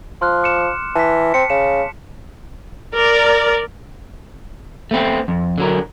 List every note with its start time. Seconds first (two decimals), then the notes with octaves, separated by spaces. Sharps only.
0.22 F3 C6 F6 F#6
0.43 D6 C#7 E7
0.95 E3 A5 B6
1.34 C4 C#7
1.50 C#3 E7
2.94 A#4 D5
4.91 A3 B3 C4
5.28 F2
5.58 D3 F#3 A#4